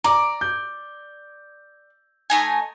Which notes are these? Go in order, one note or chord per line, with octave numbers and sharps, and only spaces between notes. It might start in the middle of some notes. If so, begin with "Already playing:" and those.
D5 A#5 D6
G6
A3 D#4 G#5